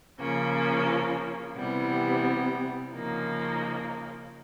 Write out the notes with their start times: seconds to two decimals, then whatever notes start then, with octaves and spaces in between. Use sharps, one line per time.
0.18 C#3 F3 A#3 C#4
1.56 C3 E3 G3 B3
2.93 C#3 F3 A#3 D#4